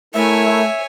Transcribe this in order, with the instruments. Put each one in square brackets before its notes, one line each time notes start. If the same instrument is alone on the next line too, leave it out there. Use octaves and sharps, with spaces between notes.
[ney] A3 [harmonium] E4 A#4 [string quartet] C#5 G#5 [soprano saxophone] E5